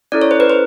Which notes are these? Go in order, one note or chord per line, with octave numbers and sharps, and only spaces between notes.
C#4 E4 A4 D5
C#5
C5
B4
C5